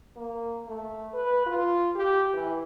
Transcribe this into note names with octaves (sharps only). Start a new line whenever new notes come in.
A#3
A3
B4
F4
G4
E3